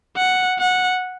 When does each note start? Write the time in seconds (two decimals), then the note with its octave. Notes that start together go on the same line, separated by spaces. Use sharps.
0.16 F#5
0.59 F#5